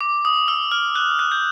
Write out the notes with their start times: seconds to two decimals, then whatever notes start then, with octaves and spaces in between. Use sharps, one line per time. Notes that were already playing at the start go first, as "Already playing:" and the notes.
0.01 D6
0.25 D#6
0.48 E6
0.71 F6
0.95 F#6
1.19 F#6
1.32 G6